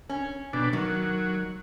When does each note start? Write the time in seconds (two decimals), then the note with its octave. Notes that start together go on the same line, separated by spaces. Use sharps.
0.09 C#4
0.53 F2 B2 D4
0.73 D#3 F#3